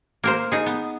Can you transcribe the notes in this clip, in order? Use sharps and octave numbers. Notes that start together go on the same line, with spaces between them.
A#3 A#4 C5
D#4 G#4
B3